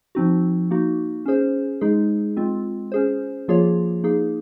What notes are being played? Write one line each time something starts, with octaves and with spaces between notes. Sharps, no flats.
F3 C4 D#4 F#4
A#3 D#4 F#4
C#4 G#4 C5
G#3 D#4 G#4
G#3 C4 F4
C#4 G#4 C5
F3 A#3 F4 G#4 C#5
A#3 D#4 G#4